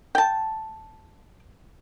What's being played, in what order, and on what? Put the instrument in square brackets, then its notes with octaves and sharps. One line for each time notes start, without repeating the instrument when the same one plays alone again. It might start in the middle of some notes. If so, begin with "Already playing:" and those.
[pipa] G5 A5